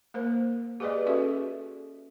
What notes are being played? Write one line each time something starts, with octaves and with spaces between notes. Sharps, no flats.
A#3 A#4 C5
G4 G#4 B4 D5 D#5
C#4 F#4 G#4 A4 E5